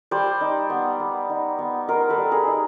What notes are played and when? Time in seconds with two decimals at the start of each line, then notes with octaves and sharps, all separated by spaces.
0.11 G3 C5 D5
0.41 D#4
0.70 B3
1.00 B3
1.30 D#4
1.59 B3
1.88 D#4 A#4 C5
2.09 A4 B4
2.18 G3
2.31 G#4 A#4
2.47 D#4